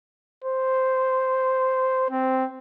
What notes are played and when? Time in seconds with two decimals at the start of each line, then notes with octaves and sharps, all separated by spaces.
0.44 C5
2.10 C4